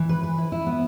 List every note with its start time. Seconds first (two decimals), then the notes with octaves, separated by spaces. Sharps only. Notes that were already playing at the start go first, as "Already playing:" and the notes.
Already playing: E3
0.09 B4
0.23 B4
0.38 E4
0.52 E4
0.66 B3